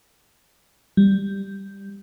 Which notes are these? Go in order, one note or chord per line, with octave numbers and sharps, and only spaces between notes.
G3